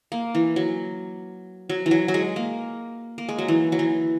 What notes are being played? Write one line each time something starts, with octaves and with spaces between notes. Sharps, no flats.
A#3
E3
F#3
F#3
E3
F#3
F#3
G#3
A#3
A#3
G#3
F#3
E3
F#3
E3